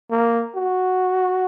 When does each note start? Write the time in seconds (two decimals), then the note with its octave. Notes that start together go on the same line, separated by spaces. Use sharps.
0.11 A#3
0.56 F#4